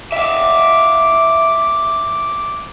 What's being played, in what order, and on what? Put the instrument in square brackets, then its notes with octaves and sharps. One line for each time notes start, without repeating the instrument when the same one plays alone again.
[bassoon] E4 [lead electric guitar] E5 F5 [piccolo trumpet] D6